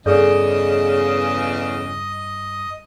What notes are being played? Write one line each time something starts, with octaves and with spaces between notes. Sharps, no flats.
E2 G2 C#3 G#4 A4 D5 D#5